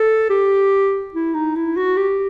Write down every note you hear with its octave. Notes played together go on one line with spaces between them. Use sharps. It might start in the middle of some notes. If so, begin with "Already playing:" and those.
Already playing: A4
G4
E4
D#4
E4
F#4
G4